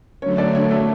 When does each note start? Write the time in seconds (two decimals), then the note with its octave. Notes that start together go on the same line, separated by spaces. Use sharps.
0.22 D3 F#3 A3 C#4 C#5
0.38 D4 D5
0.55 C#4 C#5
0.71 A3 A4